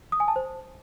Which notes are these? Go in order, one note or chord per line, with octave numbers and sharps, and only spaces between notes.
D#6
G#5
A5
C5